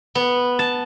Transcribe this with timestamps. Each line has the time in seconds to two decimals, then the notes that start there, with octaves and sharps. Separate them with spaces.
0.15 B3
0.59 A5